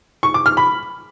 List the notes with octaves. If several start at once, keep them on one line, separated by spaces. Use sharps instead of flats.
C#6
D6
F6
B5